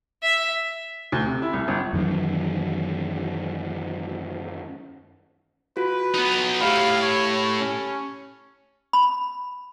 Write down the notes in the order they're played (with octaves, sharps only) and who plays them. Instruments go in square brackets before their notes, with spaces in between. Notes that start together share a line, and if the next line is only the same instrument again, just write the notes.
[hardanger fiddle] E5
[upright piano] D2
C3
E4
C2
G1
[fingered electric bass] F#2 D#3 E3
[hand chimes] F4 F#4 [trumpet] B4
[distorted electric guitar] B3 D#4
[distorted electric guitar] A2 [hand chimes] G4 B5 [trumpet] F5
[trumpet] C#5
C#4
[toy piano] B5